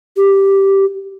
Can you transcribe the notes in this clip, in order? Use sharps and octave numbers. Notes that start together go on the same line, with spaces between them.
G4